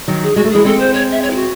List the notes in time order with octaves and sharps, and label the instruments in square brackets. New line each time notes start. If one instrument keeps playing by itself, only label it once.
[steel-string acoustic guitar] D#3 F#3
[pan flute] G#4
[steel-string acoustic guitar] G#3 [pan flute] F#4
[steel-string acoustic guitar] A3
[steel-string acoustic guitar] E3 G#3 [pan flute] G#4
[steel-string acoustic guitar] G#3 C4 [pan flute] A4
[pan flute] C5
C#5
E5
C#5
E4
F#4